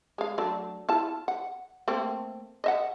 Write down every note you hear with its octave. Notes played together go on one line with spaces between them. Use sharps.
G#3 F5
F#3 A3 D4
E4 F4 A5
F#5
A3 A#3 C4
D#5 E5 F#5